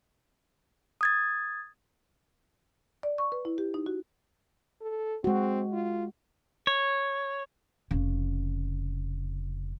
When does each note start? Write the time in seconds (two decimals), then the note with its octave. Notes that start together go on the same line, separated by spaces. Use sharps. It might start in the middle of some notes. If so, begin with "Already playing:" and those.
1.01 D#6 G#6 A6
3.03 D5
3.18 C#6
3.32 B4
3.45 E4
3.58 G4
3.74 D#4
3.86 F#4
4.81 A4
5.24 G#3 C4 F#4
5.72 F4
6.67 C#5
7.91 F1 C#3